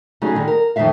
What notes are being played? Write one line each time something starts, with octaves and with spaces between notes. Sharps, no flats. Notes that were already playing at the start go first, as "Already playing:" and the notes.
C#3 F#3 G3 A3 D#4 G#4
D3 D#3 G3
A#4
F2 D#3 E3 A3 E5 F5